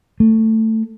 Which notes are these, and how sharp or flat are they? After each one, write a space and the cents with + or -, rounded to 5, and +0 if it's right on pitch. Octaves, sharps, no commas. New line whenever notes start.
A3 +15